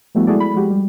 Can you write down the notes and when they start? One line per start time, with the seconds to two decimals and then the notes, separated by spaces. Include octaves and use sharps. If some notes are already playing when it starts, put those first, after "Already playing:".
0.15 F3 G3 A3 B3 E4 F#4
0.27 G#3 E4 F#4 G#4 A4 D5
0.40 B5
0.54 F3 G#3 F#4 G4
0.70 G3